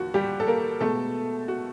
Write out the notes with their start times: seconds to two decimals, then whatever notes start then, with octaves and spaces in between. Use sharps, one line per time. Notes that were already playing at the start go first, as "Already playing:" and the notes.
Already playing: D#2 F3 F#4
0.14 G3 G4
0.40 A4
0.47 A#3 A#4
0.80 B2 G#3 A3 B3 A4
1.48 F#4